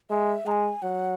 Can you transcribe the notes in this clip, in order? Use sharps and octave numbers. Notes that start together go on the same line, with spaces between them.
G#3 E5
G#3 A#5
G#5
F#3 F#5